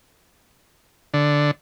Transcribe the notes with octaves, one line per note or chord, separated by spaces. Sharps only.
D3